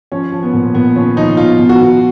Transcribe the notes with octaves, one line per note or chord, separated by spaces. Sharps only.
F3 C#4
F3
B3
A#2
A#2 B3
F3 C#4
F3 D#4
B2 F4
B2
F#4
B2